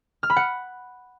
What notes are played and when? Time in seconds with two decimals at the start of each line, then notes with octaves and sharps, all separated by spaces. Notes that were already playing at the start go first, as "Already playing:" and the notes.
0.23 F6
0.30 B5
0.36 F#5